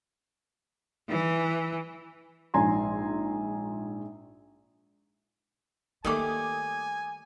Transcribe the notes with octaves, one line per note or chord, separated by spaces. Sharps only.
E3
A#1 G#2 G#5 A#5 C6
D#3 G3 A3 A#3 G#5 D6 D#6